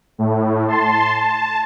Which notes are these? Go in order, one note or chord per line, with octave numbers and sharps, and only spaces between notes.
A2
A5 C6
A5